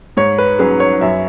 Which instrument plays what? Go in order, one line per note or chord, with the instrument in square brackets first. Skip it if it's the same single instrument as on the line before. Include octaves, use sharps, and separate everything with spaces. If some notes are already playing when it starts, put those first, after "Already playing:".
[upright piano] G#2 [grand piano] C#5
[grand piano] B4
[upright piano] F#3 C#4 G#4 [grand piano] B4
[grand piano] C#5
[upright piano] F#2 [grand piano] E5